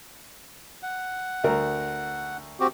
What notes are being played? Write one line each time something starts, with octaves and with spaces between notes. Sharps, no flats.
F#5
D2 A#4
C4 F#4 G4